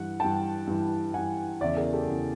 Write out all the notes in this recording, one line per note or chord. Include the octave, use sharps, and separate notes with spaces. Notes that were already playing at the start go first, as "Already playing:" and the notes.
Already playing: G2 E3 F#5
G2 E3 G5 A5
G2 E3
G2 E3 F#5 G#5
E2 C#3 E3 D5 E5
G#4 A#4
G4 A4
E2 C#3 E3